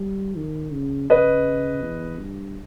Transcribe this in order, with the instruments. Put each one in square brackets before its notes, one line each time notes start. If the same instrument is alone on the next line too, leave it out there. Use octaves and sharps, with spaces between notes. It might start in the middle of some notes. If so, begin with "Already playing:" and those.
Already playing: [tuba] G3
D#3
C#3
[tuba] C#3 [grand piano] B4 D#5
[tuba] E2
G2